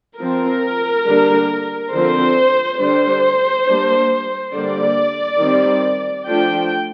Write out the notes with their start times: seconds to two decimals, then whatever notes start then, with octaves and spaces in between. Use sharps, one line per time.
0.19 F3 C4 A#4
1.06 D3 G3 A#3 D4
1.92 D3 F3 C4 C5
2.79 D3 G3 D4 C5
3.66 G3 A#3 D4
4.53 D3 G3 A#3 D5
5.40 D#3 G3 C4
6.27 F3 A3 D4 G5